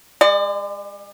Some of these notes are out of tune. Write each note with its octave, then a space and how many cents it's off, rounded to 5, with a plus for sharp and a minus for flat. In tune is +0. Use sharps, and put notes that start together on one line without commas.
G#3 -30 D5 +35